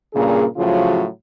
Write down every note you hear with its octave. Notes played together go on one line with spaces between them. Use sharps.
G2 A#2 C#3 A#3 G#4
A2 C#3 F3 F#3 F4 F#4